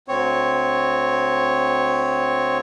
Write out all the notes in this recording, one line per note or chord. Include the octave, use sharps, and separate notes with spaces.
D2 C4 C#5